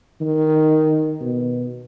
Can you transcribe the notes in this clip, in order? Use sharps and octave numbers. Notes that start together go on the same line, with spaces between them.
D#3
B2